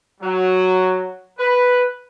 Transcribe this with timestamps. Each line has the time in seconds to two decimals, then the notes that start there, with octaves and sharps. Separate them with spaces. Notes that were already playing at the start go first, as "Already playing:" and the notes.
0.20 F#3
1.38 B4